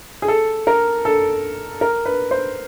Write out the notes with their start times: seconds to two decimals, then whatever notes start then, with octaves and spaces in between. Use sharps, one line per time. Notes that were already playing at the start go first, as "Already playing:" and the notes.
0.22 G#4
0.28 A4
0.67 A#4
1.05 A4
1.81 A#4
2.06 B4
2.31 C5